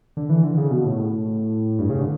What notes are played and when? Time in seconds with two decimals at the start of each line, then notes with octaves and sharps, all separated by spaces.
0.17 D3
0.30 E3
0.44 D3
0.57 C#3
0.70 B2
0.84 A2
1.79 G2
1.90 C#3
2.00 D3